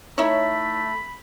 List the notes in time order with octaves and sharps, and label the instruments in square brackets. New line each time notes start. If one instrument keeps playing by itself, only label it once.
[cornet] A3 [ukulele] D#4 E4 E5 [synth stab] C#5 [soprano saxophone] B5